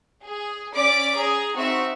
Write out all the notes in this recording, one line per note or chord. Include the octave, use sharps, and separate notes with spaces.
G#4
C#4 D5 D6 B6 D7
G#4 A#5
C4 D#4 F#4 E5